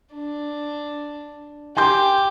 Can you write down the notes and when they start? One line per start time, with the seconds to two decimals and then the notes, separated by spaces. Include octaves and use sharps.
0.15 D4
1.77 G4 G#5 C6 G6